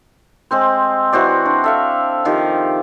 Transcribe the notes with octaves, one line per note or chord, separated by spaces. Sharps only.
G#3 C4 C5
E3 F#4 C5 D5
D4
A4 E5 F5
D#3 F3 G4